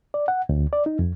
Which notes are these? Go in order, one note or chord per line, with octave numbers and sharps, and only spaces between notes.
D5
F#5
D2
D5
D#4
F2